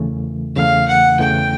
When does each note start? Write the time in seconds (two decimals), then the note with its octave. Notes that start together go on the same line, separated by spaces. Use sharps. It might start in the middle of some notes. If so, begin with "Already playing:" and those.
Already playing: E2 C#3 E3 A3
0.56 E2 C#3 E3 A3 F5
0.87 F#5
1.19 E2 C#3 E3 A3 G5